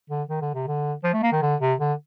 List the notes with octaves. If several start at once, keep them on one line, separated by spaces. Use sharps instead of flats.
D3
D#3
D3
C3
D3
F3
A3
A#3
D#3
D3
C3
D3